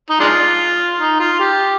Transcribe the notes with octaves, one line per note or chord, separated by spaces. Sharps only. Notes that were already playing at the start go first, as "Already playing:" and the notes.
D#4
G#3 D4 F4
D#4
F4
G4